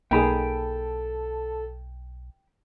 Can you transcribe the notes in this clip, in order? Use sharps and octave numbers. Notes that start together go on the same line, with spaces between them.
B1 A#3 D#4 G#4 A4 G5 B5